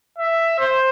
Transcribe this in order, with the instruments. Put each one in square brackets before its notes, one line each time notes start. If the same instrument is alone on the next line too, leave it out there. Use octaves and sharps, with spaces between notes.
[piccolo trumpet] E5
C5